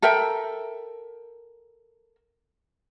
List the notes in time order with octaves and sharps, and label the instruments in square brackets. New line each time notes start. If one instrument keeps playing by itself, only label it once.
[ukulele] A4 A#4 E5 G5